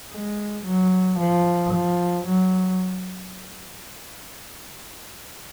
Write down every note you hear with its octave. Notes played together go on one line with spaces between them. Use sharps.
G#3
F#3
F3
F3
F#3